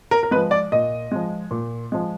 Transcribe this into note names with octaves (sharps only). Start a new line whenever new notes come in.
A#4
A#4
F3 G#3 B4
D5
A#2 D#5
F3 G#3
A#2
F3 G#3